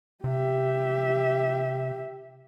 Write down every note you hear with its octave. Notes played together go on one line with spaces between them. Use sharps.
C3 G4 E5